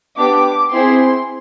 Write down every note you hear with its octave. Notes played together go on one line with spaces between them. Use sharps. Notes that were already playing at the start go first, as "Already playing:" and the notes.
B3 D4 G4 D6
C4 E4 G#4 C6